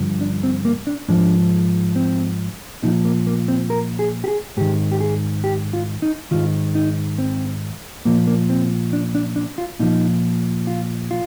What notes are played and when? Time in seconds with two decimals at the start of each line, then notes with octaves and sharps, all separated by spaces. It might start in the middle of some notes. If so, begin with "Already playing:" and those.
Already playing: G2 D3 F3
0.21 D4
0.43 C4
0.65 A#3
0.87 D4
1.08 G#2 F3 D4
1.96 C4
2.83 A#2 F3 D#4
3.05 A#3
3.27 A#3
3.48 C4
3.70 A#4
3.99 G#4
4.24 G4
4.28 G#4
4.57 G#2 D#3 G4
4.92 G4
5.00 G#4
5.44 G4
5.73 F4
6.02 D#4
6.31 G#2 D#3 F4
6.75 D#4
7.18 C4
8.05 A#2 F3 A#3
8.27 A#3
8.50 C4
8.93 D4
9.15 D4
9.36 D4
9.58 F4
9.79 A#2 F3 D#4
10.67 F4
11.11 F4